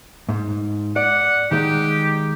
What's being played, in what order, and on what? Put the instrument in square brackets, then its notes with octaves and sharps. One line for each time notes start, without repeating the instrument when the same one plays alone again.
[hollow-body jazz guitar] G#2
[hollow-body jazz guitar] D5 [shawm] F#5
[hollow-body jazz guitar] D#3 G#3 [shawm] G4